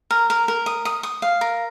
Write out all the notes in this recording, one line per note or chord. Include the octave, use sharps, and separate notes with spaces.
A#4
A#4
A#4
D#6
D#6
D#6
F5
A#4